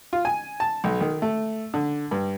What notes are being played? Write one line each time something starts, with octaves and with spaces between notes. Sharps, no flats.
F4
G#5
A5
B1
D#3
A3
D3
G2